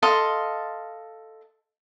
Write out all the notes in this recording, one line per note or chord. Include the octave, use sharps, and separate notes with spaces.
A4 D#5 F5 C6